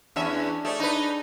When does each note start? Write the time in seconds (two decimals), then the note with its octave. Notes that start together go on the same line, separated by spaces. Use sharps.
0.16 E2 C#4 D4 E5
0.65 A3 G#4 C#5 D5
0.80 D4 D#4 B4